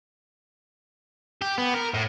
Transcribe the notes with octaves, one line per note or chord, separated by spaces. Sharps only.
G4
B3
A#4
A2